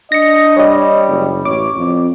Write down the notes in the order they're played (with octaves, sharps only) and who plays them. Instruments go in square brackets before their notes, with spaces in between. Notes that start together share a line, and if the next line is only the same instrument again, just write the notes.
[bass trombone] D4 [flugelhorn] D#5 [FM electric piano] A#6 C#7
[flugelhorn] G3 [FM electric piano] C#5 D#5
[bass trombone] F#1
[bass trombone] A1 [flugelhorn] C#5 [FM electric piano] D6
[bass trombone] F2